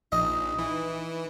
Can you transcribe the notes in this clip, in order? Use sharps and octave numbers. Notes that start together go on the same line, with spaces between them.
A#1 D#4 D#5
E3